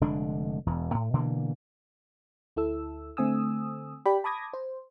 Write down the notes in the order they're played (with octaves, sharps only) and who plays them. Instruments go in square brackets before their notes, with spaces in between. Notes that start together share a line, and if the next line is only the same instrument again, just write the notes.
[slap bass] F1 D3 G#3 D4
E1 E2
A2
B2 D3 E3 A#3
[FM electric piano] D2 E4 A4 E6
D3 A3 C4 G#5 D#6 E6
G4 D5 G5 B5
A5 B5 D6 D#6 G#6 A#6
C5